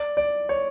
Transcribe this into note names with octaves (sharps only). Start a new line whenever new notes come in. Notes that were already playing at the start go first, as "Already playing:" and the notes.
Already playing: D5
D5
C#5